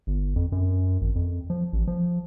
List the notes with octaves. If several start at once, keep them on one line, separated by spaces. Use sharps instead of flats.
G1
F2
F#2
G#1
F2
F3
A1
F3